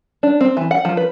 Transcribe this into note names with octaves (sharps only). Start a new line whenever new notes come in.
D4
C4
E3
F#5
F3
B4